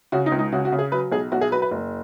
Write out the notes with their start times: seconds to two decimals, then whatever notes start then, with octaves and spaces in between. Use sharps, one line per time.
0.12 C#3 F#4
0.26 D#4
0.32 C#2
0.39 D#4
0.52 C#3 F#4
0.65 F#4
0.72 C#3
0.79 G#4
0.92 F#3 B4
1.12 B1 G#4
1.32 B1 F#4
1.41 G#4
1.52 F#3 B4
1.62 B4
1.71 F#1